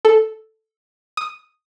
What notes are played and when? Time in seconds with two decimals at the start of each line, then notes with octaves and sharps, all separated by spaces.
0.05 A4
1.17 D#6